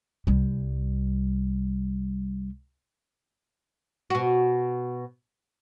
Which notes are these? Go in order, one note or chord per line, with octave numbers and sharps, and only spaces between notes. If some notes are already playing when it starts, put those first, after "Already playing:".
C2 G3
B2 F#4